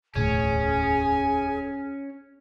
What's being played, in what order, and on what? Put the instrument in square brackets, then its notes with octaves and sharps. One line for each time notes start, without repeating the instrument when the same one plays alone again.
[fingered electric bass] E1 D2 A2 [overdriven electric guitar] C#4 [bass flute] G#4 [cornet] G#5